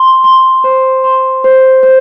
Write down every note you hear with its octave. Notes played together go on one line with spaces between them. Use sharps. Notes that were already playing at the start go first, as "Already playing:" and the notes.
Already playing: C6
C6
C5
C6
C5
C5